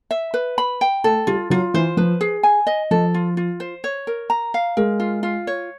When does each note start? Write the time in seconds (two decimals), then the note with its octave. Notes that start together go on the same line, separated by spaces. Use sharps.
0.11 E5
0.34 B4
0.58 B5
0.81 G5
1.04 A3 A4
1.27 G3 F4
1.50 F#3 F4
1.74 E3 C5
1.97 F3 B4
2.21 G#4
2.43 G#5
2.67 D#5
2.91 F3 A4
3.14 F4
3.37 F4
3.60 C5
3.84 C#5
4.07 A#4
4.30 A#5
4.54 F5
4.77 G#3 A#4
5.00 F4
5.23 F4
5.47 C#5